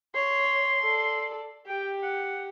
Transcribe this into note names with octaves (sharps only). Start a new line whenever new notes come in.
C#5 C6
A4 D5
G4 G5
F#5